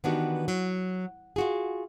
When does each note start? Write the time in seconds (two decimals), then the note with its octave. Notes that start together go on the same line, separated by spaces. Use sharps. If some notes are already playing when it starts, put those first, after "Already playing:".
0.04 D#3 E3 B3 D4 F#4 G4
0.48 F#3
1.36 F4 F#4 G#4